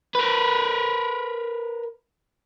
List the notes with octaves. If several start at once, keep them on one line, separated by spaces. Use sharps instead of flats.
A#4 B4